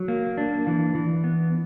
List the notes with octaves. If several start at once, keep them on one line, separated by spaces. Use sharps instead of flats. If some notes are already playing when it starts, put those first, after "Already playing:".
Already playing: F#3
A#3
D4
E3
E3
B3